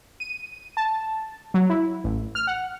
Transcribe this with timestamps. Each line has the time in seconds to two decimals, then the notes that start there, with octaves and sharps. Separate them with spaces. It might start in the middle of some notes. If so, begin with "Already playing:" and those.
0.20 D#7
0.77 A5
1.54 F#3
1.69 E4
2.04 A1
2.35 F6
2.47 F#5